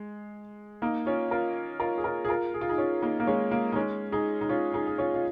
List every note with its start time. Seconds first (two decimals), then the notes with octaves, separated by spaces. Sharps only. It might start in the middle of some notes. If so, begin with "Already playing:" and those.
Already playing: G#3
0.82 A#3 D#4
1.06 C#4 F4
1.31 F4 A#4
1.80 F4 A#4
1.98 G#4
2.04 F4 A#4
2.25 G#4
2.29 F4 A#4
2.54 G#4
2.61 F4
2.69 D#4 G#4
2.78 C#4 F4
3.02 A#3 D#4
3.20 A#3
3.27 G#3 C#4
3.51 A#3
3.72 D#4
3.76 G#3 C#4
4.12 D#4 G#4
4.41 D#4
4.49 C#4 F4
4.74 D#4 G#4
4.87 G#4
4.98 C#4 F4
5.14 F4